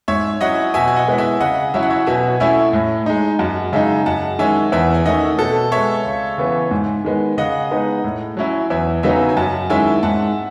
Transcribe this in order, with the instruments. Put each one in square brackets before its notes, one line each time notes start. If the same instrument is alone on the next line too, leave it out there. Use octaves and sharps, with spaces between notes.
[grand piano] G#2 [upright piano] C#5 E5
[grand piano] F#3 C#4 E4 [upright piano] D#5 F#5
[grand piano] B2 [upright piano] E5 G#5
[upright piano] G#5
D#5 F#5
[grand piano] G#3 B3 E4
[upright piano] E5 G#5
[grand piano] C#3 [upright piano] D#5 F#5
[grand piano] F#3 C#4 E4 [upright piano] E5
[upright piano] F#5
C#5 E5
[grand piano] B2 [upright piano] E5 G#5
[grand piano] A3 C#4 E4 [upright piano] E5 G#5
[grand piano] A2
G#3 D#4
[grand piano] F#2 [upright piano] F#5 A5
[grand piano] C#3 G#3 D#4 [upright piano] E5 G#5
[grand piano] F#2 [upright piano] F#5 A5
[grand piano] D#3 G#3 C#4 [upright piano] E5 G#5
[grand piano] E2 [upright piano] E5 G#5
[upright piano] G#5
[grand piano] D#3 A3 C#4 [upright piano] D#5 F#5
[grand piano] B2 [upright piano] A4
[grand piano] G#3 B3 [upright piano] C#5 E5
[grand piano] C#2
C#3 E3 B3
G#2
D#3 G#3 B3
[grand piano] C#3 [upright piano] D#5 F#5
[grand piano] G#3 B3 D#4
A2
F#3 C#4 E4
[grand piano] E2 [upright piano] E5 G#5
[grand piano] C#3 F#3 B3 D#4 [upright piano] E5 G#5
[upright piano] G#5
[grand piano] F#2 [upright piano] F#5 A5
[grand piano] D#3 G#3 C#4 E4 [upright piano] E5 G#5
[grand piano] G#2 [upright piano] F#5 A5